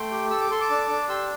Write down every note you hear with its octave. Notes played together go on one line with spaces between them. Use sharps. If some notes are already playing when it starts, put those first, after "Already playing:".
Already playing: A3 G5 C6
G4
A4 E6
D6
A4 C6
A5 D6
D4
D4
G4 C6 E6